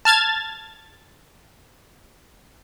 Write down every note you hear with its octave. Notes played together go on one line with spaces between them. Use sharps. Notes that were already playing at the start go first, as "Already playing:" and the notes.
A5 F6 G#6 A6